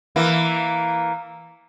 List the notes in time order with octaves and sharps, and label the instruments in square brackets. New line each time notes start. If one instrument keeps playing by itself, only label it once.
[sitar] E3 A#3